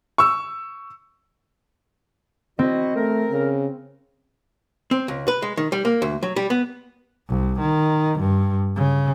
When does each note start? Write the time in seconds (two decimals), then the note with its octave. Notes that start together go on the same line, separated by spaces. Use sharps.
0.18 C#6 E6
2.59 C4 E4 F#4 D#5
2.96 A3 A#4
3.31 C#3
4.91 C4
5.08 C#2
5.28 B4
5.42 G#3
5.57 D#3
5.72 G3
5.85 A#3
6.02 D2
6.23 F#3
6.36 G3
6.50 B3
7.29 C2
7.60 D#3
8.19 G2
8.76 C#3